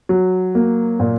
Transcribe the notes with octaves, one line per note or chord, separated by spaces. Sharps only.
F#3
A#3
A#2